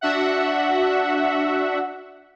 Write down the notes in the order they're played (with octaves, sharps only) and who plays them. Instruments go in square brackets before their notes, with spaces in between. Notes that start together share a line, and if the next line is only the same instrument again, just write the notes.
[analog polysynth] D4 F#4 E5 F#5